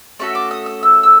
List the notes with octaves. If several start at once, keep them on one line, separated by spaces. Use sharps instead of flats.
A3 C#4 F#4 A4 C#6
D6
D#6
D#6
E6
E6